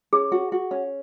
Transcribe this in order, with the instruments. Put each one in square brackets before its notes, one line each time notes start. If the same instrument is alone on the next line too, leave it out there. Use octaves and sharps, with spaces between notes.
[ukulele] C#4 [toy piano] G#4
[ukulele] F#4
F#4
C#4